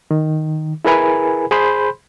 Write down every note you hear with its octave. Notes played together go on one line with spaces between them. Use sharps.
D#3
E4 G#4 A#4 B4 G#5 B5
G#4 C5 B5 C6 G6